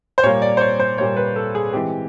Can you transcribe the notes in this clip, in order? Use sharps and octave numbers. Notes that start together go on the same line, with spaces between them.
C5
A#2 G3 A#3 C#5
D5
C5
C#5
C5
A#2 G3 A#3 C#5
B4
A4
G#4
E3 G#3 C4 G4